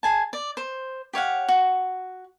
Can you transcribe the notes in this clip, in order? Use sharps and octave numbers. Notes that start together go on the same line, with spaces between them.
G#4 G#5 A5
D5
C5
G4 C#5 F5 F#5
F#4